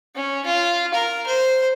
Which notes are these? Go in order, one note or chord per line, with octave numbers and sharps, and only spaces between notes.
C#4
F4
A#4
C5